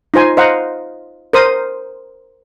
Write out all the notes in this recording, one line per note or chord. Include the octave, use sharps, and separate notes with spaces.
D#4 F4 C5 G#5
C5 D#5 F5 F#5 A#5
A#4 C5 D#6